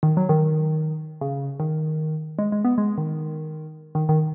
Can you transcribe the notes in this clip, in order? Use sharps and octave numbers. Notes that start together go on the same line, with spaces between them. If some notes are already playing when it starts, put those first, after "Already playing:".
D#3
F#3
D#3
C#3
D#3
G#3
G#3
B3
G#3
D#3
D#3
D#3